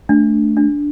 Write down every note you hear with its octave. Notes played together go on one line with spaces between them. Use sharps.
A3 D4
D4